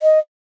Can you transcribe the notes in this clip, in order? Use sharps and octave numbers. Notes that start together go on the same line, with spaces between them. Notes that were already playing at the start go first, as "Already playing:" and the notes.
D#5